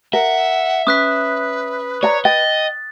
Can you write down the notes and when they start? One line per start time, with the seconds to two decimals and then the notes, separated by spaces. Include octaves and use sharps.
0.13 A#4 E5 F#5
0.87 C#4 B4 D#6 F#6 B6
2.03 C#5 D5 A#5
2.25 D#5 G5 A6